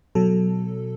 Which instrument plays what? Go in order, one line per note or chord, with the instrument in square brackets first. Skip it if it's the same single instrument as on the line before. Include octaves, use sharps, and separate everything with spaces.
[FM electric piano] B2 F#3 A4